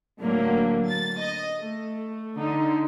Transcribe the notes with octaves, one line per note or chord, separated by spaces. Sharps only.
A2 D3 F#3 A#3
A6
D#5
A3
D3 D#4